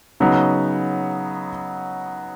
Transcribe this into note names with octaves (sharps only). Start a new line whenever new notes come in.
C#3 F#3 B3 D#4